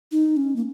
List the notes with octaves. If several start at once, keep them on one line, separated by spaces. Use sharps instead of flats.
D#4
C#4
A#3